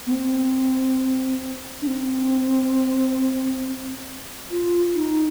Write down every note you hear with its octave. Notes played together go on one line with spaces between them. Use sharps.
B3
C4
D4
C4
F4
D#4